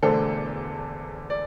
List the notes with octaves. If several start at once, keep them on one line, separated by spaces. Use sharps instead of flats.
E1 E2 D3 A3 A4 C5
D5